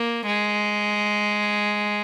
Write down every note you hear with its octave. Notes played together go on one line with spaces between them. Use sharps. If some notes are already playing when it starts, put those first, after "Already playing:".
Already playing: A#3
G#3